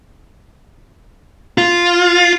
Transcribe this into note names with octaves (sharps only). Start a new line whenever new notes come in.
F4